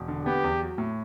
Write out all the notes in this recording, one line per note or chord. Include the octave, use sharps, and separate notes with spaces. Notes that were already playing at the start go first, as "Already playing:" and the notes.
Already playing: E1
D3
B3 G4
E2
F#3
A2